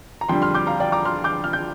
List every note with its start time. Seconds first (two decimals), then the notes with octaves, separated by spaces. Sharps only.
0.21 A#5
0.29 F2 D3 G3 G5 C6
0.42 C6 F6
0.54 D6 G6
0.67 F5 A#5
0.80 D5 G5
0.92 A#5 D6
1.05 C6 F6
1.24 D6 G6
1.44 F6
1.53 G6